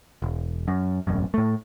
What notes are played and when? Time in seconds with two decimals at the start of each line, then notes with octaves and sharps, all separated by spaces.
0.22 E1
0.68 F#2
1.07 E1 A1 F#2
1.34 A2 A3